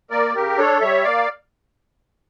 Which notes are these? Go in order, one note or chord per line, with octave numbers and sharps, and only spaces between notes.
A#3 A#4 D5
C#3 G4 A#4
D4 A4 C#5
G3 C#5 E5
A#3 D5 F5